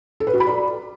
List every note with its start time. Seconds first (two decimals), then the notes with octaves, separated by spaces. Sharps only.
0.20 A4
0.27 B4
0.34 F#4
0.40 B5
0.47 D5